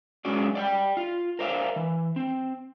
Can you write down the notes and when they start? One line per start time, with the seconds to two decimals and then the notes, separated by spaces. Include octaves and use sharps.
0.25 F#3 G#3 C#4 F4 F#4 D5
0.55 D5 F#5 G5
0.97 F4
1.39 A#4 C5 D5 E5 F5
1.76 E3
2.16 C4